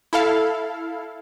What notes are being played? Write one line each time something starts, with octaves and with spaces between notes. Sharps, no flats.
E4 A4 F5